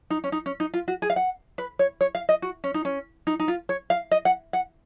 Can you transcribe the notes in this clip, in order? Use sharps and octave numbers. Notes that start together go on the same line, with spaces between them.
D#4
C#4
D#4
C#4
D#4
F4
F#4
G#4
F5
F#5
B4
C#5
C#5
F5
D#5
F#4
C#4
D#4
C#4
D#4
D#4
F4
C#5
F5
D#5
F#5
F#5